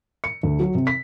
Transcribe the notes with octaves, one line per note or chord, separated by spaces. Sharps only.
C#7
D2
F#3
C3
B6